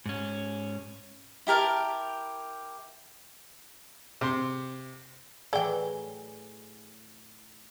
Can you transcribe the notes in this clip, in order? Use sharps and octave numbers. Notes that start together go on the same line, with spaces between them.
G#2 C#4
E4 G4 A#4 A5
C3 C6
A2 E3 F#3 G#4 D5 G5 G#5 G7